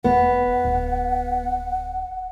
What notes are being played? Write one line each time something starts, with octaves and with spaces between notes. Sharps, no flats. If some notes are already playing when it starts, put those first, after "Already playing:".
E1 B3 F#5
D1